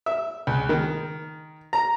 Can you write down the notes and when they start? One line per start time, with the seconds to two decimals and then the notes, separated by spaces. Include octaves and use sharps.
0.06 E5
0.47 C#2
0.69 D#3
1.73 A#5